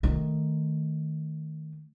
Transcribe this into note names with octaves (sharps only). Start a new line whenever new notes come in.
D#3 A3